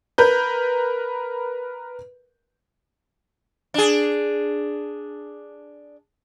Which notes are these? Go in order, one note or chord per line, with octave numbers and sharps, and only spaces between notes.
A#4 B4 G6
D4 G#4